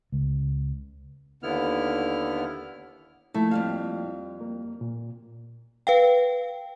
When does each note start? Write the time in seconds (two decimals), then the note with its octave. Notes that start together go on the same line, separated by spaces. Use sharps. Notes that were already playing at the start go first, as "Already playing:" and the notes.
0.12 C#2
1.43 D#2 D3 B3 E4 F6
3.34 F3 A3 A#3 E4
3.51 F2 G3 F5
4.41 A#3
4.81 A#2
5.87 B4 F5 G5